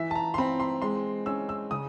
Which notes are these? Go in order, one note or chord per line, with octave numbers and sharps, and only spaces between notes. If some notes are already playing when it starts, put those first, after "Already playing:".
Already playing: E3 E5
A5
A#5
C6
C4 B5
C6
G#3 C6
C#4 E6
E6
C#3 D#6